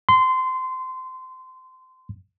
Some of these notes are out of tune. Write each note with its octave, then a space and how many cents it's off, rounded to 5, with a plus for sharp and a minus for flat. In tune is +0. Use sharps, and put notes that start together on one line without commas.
C6 -20